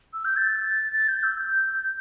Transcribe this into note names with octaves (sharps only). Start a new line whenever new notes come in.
E6
G6
A6
A6
G6
E6
G6